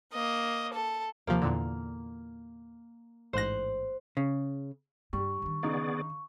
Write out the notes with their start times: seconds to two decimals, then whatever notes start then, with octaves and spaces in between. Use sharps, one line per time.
0.13 A#3 D#5
0.74 A4
1.27 D#2 C3 F3 A#3
1.42 E2 A#2 D3
3.33 A1 G#2 C5 F#6 A#6
4.17 C#3
5.13 G2 G3 C#6
5.42 D3 D#3
5.63 C#3 B3 D#4 G#4 D5